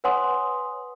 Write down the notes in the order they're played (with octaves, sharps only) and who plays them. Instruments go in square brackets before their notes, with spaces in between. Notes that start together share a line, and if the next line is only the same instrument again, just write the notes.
[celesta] B4 C#5 F#5 G#5 C6 D#6